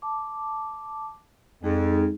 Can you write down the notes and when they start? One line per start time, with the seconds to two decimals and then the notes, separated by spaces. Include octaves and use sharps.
0.02 A5 D6
1.63 F2 G#3 D#4 G#4